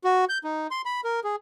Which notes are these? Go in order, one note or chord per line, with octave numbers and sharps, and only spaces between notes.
F#4
G6
D#4
C6
B5
A#4
G#4